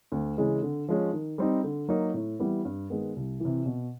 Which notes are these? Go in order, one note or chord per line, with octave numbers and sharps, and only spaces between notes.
D2
C#3 E3 G#3
D3
F3 G#3 C#4
D#3
G3 C4 D#4
D3
F#3 A#3 D#4
A2
E3 G3 B3 E4
G2
D#3 G#3 B3
C2
C3 E3
B2